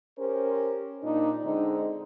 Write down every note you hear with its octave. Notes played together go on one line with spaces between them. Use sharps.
C#4 G4 A#4 C5
A#2 D4 D#4
D3 G#3 C4 D#4